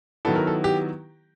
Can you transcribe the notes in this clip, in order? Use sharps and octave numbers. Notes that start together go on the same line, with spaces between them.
D#3 F#3 B3 E4 A4
A#4
A4
G4